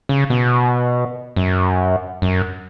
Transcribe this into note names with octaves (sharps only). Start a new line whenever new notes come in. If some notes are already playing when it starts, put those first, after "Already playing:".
C#3
B2
F#2
F#2